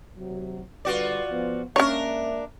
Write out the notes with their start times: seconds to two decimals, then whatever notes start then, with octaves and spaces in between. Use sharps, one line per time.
0.17 D#2 C3 F#3
0.85 D3 G3 F4 F#4 B4 D5
1.31 F3 B3
1.76 G#3 A#3 C#4 D4 A#4 C#5 E5